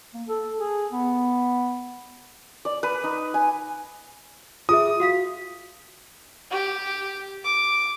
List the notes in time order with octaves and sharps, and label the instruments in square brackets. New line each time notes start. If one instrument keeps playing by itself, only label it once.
[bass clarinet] A#3
A4
G#4
B3
[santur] D5
B4
D#4
G#5
[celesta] F4 G#4 E5 [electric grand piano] D#6
[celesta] F#4 F5 B6
[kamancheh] G4
D6